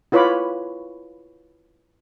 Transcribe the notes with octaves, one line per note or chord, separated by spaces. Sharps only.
E4 F4 B4 C#5 B5 D6